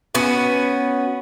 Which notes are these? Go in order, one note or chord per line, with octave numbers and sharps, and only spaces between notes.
B3 C#4 F#4